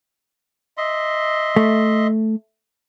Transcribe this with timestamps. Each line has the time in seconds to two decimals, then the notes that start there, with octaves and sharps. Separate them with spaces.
0.78 D#5 E5 C6
1.56 A3